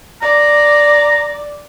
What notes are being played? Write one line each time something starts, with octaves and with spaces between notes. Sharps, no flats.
D5 A#5